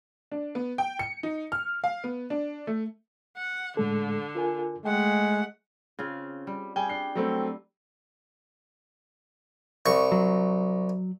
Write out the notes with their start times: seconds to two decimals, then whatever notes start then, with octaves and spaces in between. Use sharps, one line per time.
0.31 D4
0.55 B3
0.78 G5
0.99 C#7
1.23 D#4
1.52 F6
1.84 F5
2.04 B3
2.30 D4
2.67 A3
3.37 F#5
3.77 A2 D3 G#3 A4
4.35 F4 A#4 G#5
4.85 G#3 A3 F#5 G5
5.99 C#3 C4 F4
6.47 G3
6.76 G3 G#4 G5 G#5
6.89 D4 C7
7.15 F#3 G3 A3 C4
9.86 C2 C#6
10.12 F#3